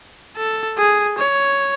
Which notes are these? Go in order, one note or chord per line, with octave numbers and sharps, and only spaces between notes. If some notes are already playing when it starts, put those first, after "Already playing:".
A4
G#4
C#5